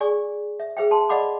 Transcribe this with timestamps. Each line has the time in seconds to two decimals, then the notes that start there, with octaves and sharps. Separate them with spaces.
0.01 G#4 D5 G#5 C#6
0.60 E5
0.77 G#4 B4 C5 E5 F5 G5
0.91 C5 A5 C6
1.09 D5 D#5 F5 F#5 B5 D6